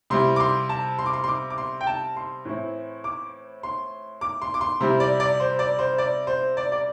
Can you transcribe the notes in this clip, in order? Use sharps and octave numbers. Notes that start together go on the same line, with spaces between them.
C3 G3 E4 C6
D6
C6
A5
C6
D6
C6
C6
D6
D6
C6
G5
A5
C6
A2 E3 C4 E4
D6
C6
D6
C6
D6
C6
C3 G3 E4 C5
D5
D5
C5
D5
C5
D5
C5
D5
D5